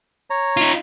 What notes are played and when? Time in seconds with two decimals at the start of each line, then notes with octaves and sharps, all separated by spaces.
0.30 C#5 A#5
0.57 D#4 F4